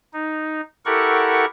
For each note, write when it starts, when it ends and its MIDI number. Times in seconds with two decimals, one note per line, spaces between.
0.14 0.61 63
0.86 1.45 64
0.86 1.45 67
0.86 1.45 69
0.86 1.45 70
0.86 1.45 78
0.86 1.45 85